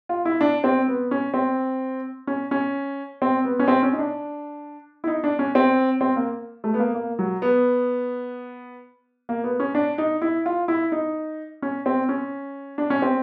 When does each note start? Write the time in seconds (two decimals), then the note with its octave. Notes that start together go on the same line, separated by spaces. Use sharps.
0.09 F4
0.25 E4
0.41 D4
0.64 C4
0.88 B3
1.11 C#4
1.34 C4
2.27 C#4
2.51 C#4
3.22 C4
3.45 B3
3.59 C#4
3.68 C4
3.83 C#4
3.93 D#4
3.99 D4
5.04 E4
5.07 D#4
5.24 D4
5.39 C#4
5.55 C4
6.01 C4
6.16 A#3
6.64 A3
6.74 B3
6.80 A#3
6.95 A#3
7.19 F#3
7.42 B3
9.29 A#3
9.44 B3
9.60 C#4
9.75 D4
9.98 D#4
10.22 E4
10.46 F4
10.68 E4
10.92 D#4
11.62 C#4
11.86 C4
12.09 C#4
12.78 D4
12.90 C#4
13.02 C4